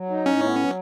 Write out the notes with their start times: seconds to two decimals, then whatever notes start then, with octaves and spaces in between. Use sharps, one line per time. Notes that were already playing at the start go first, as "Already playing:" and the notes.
Already playing: F#3
0.10 D#4
0.26 A2 C#4
0.42 B3
0.58 F#3